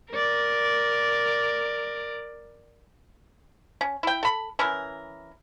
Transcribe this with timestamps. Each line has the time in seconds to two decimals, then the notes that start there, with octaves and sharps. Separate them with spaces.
0.12 A#4 D5
3.81 C#4
4.03 E4 G5
4.23 A4 B5
4.59 E3 C#4 E4 A#4